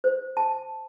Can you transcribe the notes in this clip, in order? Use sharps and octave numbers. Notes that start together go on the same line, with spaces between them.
C5
A5